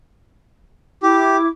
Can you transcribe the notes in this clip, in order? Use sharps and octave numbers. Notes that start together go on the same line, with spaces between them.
E4 G4 D6